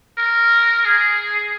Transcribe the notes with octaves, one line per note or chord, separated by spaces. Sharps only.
A#4
G#4